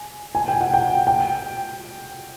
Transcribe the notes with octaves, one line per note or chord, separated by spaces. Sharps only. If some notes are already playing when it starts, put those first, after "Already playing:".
Already playing: G#5
G#5
G5
F#5
G5
G5